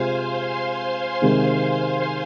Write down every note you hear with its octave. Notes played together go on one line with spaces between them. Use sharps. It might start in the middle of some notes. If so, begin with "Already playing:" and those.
Already playing: C3 G#3 F4 C5 F5 G#5 C6
C3 D#3 G#3